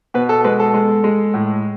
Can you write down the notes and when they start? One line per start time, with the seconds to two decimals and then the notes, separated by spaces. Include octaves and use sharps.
0.14 B2 B4
0.29 A4
0.44 G#3 B4
0.60 A4
0.74 G#3
1.04 G#3
1.34 A2